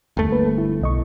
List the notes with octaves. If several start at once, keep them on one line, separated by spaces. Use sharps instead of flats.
G1 D#2 A3
A#3 B4
E4
B1 D#5 C#6